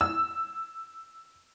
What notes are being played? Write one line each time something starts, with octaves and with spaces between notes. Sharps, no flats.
E6